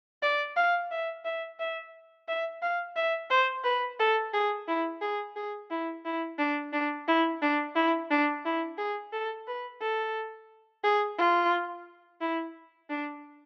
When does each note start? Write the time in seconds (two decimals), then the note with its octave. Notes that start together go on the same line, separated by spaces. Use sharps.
0.22 D5
0.57 F5
0.91 E5
1.25 E5
1.60 E5
2.28 E5
2.62 F5
2.96 E5
3.30 C5
3.64 B4
4.00 A4
4.34 G#4
4.68 E4
5.02 G#4
5.36 G#4
5.71 E4
6.05 E4
6.39 D4
6.73 D4
7.08 E4
7.42 D4
7.75 E4
8.10 D4
8.45 E4
8.78 G#4
9.13 A4
9.47 B4
9.81 A4
10.84 G#4
11.18 F4
12.21 E4
12.90 D4